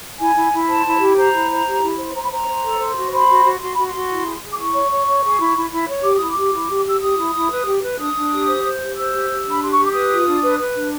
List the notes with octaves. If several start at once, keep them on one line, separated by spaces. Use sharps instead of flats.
E4 G#5
E4
E4
C5 A5
E4
G4
C5 A#5
E4
C5
G4
E4
C5
C5 A#5
B5
C5 A#5
C5
A4
C5
F#4
C5 B5
F#4
F#4
F#4 C6
F#4 B5
C6
F#4
E4
G#4
G#4
D6
E4 C#6
C#5
C#5
C#5
G#4
E4
E4
E4
C#5
G4 D6
E4 D#6
D6
G4
E4
G4
G4 E6
G4 D#6
E4
E4
B4
G4
B4
D4 D#6
D4
G4
C5
C5
G4
C5 E6
G4
G4
D4
B5
G4 C6
C#6
G4 D6
B4 D#6
F4
D4
B4
B4
D4